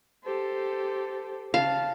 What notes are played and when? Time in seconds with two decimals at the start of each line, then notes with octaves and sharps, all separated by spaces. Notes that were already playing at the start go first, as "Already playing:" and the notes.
0.24 G4 A4 C5
1.54 C#3 F5 A5